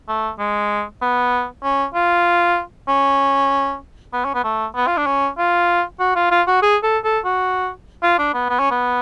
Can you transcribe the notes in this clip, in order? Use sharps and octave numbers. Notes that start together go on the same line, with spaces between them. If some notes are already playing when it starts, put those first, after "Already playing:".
A3
G#3
B3
C#4
F4
C#4
B3
C#4
B3
A3
B3
F4
D4
C#4
F4
F#4
F4
F4
F#4
G#4
A4
A4
F#4
F4
D4
B3
B3
C#4
B3